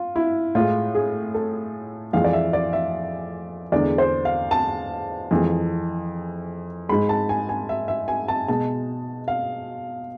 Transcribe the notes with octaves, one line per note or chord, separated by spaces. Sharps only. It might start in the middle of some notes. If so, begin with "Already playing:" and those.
Already playing: F4
E4
A2 G#3 F4
G#4
A4
F2 E3 G#3 F5
D5
E5
D5
E5
E2 D3 G#3 D5
C5
F5
A5
F2 E3 G#3
G#2 G#3 B5
A5
G#5
G#5
E5
E5
G#5
A5
B2 G#3 A5
F5